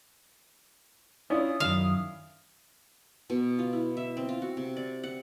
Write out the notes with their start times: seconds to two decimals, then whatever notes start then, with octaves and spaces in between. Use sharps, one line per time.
1.30 C#4 D4 E4 F4 D#6
1.60 F#2 D#3 F5
3.30 B2
3.59 F4
3.73 E4
3.97 E5
4.17 C4
4.29 F4
4.42 F#4
4.57 C3
4.77 D5
5.03 F#5